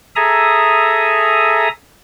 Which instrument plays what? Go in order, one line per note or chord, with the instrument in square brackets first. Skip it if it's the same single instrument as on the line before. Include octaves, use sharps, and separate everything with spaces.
[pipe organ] G#4 A4 E5 G#5 A#5 D#6